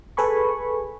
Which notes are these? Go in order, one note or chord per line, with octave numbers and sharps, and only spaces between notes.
G#4 A4 B4 G#5 B5 C#6